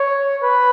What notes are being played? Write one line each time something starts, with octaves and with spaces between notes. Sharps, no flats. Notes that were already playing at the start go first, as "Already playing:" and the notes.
Already playing: C#5
B4